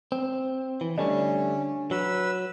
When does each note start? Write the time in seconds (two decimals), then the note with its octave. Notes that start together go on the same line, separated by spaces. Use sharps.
0.12 C4
0.81 E3
0.98 D3 G3 A3 C#4 D4
1.91 F#3 B4 E6